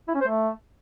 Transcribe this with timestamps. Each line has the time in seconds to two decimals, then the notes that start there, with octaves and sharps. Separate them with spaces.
0.08 E4
0.15 C#4
0.21 C5
0.28 A3